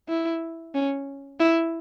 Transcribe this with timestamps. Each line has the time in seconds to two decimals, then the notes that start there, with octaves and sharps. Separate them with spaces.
0.09 E4
0.75 C#4
1.40 E4